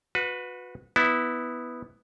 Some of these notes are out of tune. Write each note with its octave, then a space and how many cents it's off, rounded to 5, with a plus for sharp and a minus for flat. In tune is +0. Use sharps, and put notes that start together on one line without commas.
F#4 -30 B4 +0
B3 +0 E4 -15